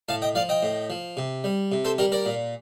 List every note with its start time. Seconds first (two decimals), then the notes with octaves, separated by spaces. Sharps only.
0.08 A2 F5 A5
0.22 D#5 G5
0.35 F3 D5 F5
0.49 D#5 G5
0.63 A2
0.90 F3
1.17 C3
1.44 G3
1.72 C3
1.85 A4 C5
1.98 G3 G4 A#4
2.12 A#4 D5
2.26 A#2